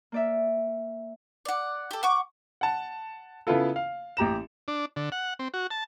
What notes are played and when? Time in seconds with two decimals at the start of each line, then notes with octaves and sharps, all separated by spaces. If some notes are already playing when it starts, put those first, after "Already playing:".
0.12 A#3 D5 E5
1.45 D5 F#5
1.91 G4 A4
2.03 F#5 C#6 D6
2.61 F#5 A5
3.47 C#3 B3 E4 F4 A4
3.76 F5
4.17 A1 G4 A#5 E7
4.68 D4
4.96 D3
5.12 F#5
5.39 C4
5.54 F#4
5.71 A5